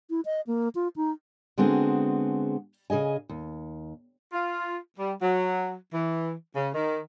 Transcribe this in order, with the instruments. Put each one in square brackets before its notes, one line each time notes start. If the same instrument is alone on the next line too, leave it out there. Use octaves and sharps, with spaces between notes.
[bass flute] E4
D#5
A#3
F4
D#4
[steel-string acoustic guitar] D3 G#3 B3 C4 F#4 G#4
C#3 G#4 D#5 G#5
D#2
[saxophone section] F4
G3
F#3
E3
C#3
D#3